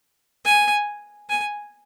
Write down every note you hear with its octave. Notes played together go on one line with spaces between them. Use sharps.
G#5
G#5